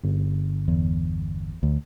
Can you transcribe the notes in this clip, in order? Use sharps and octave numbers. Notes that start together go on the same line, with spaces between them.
G1
E2
D2